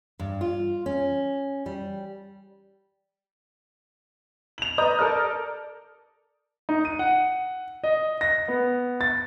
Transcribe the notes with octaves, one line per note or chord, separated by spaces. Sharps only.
G2
F4
C#4
G3
F7 F#7
B4 D5 D#5 A#5 D#6 G6
A4 A#4 D5 F6
D#4
D#7
F#5
D#5
A#6
B3
A6